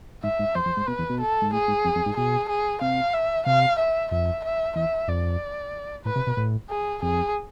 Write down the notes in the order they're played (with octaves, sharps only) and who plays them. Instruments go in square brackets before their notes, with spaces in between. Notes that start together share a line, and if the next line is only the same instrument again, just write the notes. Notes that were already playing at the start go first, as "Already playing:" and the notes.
[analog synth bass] G#2 [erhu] E5
[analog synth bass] G#2
[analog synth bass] F2 [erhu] C5
[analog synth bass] F2
G#2
[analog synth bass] B2 [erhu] B4
[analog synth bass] E2
B2
[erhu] A4
[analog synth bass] G#2
[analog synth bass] A2 [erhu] G#4
[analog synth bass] G#2
F2
F2
G#2
[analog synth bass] B2 [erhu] G#4
[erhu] G#4
[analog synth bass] C3 [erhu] F5
[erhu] E5
[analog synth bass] C3 [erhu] F5
[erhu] E5
[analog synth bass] F2 [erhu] E5
[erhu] E5
[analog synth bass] E2 [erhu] E5
[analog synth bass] F2 [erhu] D5
[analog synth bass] A2 [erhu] B4
[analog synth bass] C3
B2
A2
[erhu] G#4
[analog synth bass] F2 [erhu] G#4